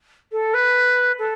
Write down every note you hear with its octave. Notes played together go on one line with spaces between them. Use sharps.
A4
B4
A4